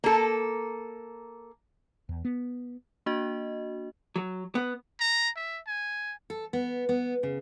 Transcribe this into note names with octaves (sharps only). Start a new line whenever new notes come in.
A#3 A4
E2
B3
A#3 D4 F#4 D#5
F#3
B3
A#5
E5
G#5
A4
B3
B3
C#3